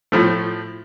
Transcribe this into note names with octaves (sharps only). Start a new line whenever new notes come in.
A2 F3 A3